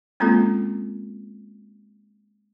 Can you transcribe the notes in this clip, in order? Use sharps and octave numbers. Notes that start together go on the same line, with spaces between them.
G#3 A#3 C4 C#4 F4 A4